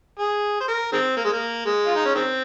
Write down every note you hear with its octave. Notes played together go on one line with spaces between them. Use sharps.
G#4
C5
A#4
D#3 G#3 C4
A#3
G#3
A#3
G#3
F4
D#4
C#4
D#3 G#3 C4